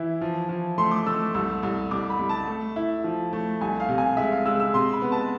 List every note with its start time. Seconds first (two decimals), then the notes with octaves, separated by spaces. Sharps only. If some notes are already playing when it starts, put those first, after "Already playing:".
Already playing: E3 E4
0.21 F3
0.49 F3
0.78 A3 C6
0.91 D6
1.06 A3 E6
1.34 C2 E6
1.63 C2
1.91 C2 D6
2.10 B5
2.19 C2
2.29 A5
2.47 A3
2.76 E4
3.04 F3
3.33 A3
3.61 C2 G#5
3.80 F5
3.89 C3
3.98 G#5
4.17 G#3 E5
4.32 F5
4.46 G#3 E6
4.60 E6
4.74 C3 C6
4.93 B5
5.02 B3
5.12 A5